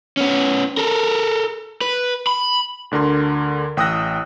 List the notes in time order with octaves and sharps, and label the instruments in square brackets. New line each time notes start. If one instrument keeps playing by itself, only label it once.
[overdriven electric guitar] B3 C#4
A4 A#4
B4
B5
[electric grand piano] D2 D3 A#4 C6
A1 G5 D#6 E6 F#6 A#6